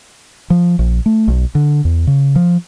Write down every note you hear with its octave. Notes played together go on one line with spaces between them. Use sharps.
F3
A#1
A3
B1
D3
E2
C#3
F3